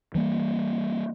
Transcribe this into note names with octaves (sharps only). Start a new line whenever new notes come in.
E3 G3 A#3